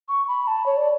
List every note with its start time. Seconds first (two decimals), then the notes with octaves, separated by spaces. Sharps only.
0.09 C#6
0.28 B5
0.47 A5
0.66 C#5
0.77 D5